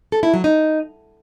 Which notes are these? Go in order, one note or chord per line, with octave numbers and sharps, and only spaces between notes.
A4
E4
F#3
D#4